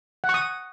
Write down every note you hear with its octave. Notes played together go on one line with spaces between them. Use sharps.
F#5
C#6
D#6